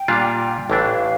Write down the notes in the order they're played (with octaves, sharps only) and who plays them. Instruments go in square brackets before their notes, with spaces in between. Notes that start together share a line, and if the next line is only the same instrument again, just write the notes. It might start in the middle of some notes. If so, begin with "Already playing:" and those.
Already playing: [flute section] G5
[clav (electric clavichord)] A#2 G3 D4 F4
[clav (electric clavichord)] A1 A2 E3 A3 D4 [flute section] F5